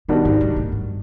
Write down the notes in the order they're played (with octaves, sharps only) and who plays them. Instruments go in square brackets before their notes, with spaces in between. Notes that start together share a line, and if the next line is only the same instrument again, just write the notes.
[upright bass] A#2 [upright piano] D#3 G3 B3 D4 F#4
[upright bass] G#2
G#2
A2
G2